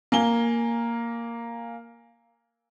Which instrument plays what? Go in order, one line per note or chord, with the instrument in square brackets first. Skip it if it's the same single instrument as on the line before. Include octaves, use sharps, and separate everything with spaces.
[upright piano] A#3 G#5 G7